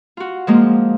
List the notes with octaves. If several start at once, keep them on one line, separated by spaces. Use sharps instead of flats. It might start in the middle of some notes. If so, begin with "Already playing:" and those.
F4 F#4
F3 G#3 A#3